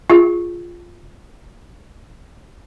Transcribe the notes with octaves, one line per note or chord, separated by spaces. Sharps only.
F4 G#4